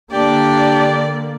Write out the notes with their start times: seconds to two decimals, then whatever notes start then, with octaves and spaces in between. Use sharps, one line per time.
0.12 D3 A#3 D4 G4 D5